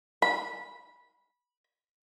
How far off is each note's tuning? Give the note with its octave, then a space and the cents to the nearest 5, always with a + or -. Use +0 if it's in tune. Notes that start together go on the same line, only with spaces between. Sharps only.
B5 -15